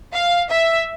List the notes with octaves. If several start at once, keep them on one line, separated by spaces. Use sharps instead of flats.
F5
E5